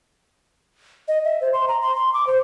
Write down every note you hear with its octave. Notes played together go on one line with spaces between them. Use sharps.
D#5
E5
C5
C6
A#5
C6
C6
D6
C5